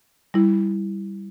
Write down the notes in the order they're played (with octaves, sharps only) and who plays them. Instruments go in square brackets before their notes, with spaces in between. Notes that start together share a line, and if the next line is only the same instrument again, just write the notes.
[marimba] G3 E4